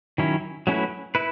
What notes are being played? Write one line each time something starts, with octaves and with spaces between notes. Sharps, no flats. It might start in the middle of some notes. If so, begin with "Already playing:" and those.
D#3 F#3 C#4 E4
F#3 A3 C#4 E4 B4
E4 B4